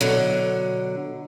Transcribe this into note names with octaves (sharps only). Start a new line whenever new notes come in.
B2 D3 F#3